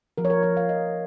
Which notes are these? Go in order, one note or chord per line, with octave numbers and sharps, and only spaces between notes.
F3 A#4
C#5
A#4
F3 C#5
F5
F3 D#5